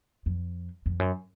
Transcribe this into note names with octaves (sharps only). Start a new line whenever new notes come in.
F2
F2
F#2